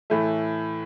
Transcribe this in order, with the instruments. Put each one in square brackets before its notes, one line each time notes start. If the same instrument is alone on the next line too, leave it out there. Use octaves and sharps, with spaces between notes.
[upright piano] A2 E3 A3